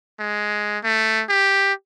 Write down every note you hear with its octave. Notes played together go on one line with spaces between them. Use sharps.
G#3
A3
G4